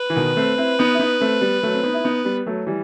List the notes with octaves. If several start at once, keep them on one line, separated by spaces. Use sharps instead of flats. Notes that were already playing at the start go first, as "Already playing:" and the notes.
Already playing: B4
E3
B2 D#3
A3 C4
C4 E4
B3 D#4
E4
B3 D#4
A3 C4
G3 B3
F#3 A3
C4
B3 D#4
E4
B3 D#4
G3 B3
F#3 A3
E3 G3